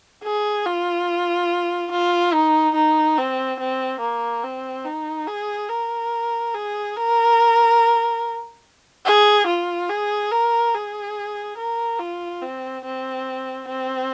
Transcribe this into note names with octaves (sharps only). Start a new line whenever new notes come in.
G#4
F4
F4
D#4
D#4
C4
C4
A#3
C4
D#4
G#4
A#4
G#4
A#4
G#4
F4
G#4
A#4
G#4
A#4
F4
C4
C4
C4